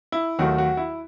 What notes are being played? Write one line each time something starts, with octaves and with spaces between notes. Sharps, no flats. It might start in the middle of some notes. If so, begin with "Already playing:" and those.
E4
D#2 D#3 F#3 A3 F#4
F#4
E4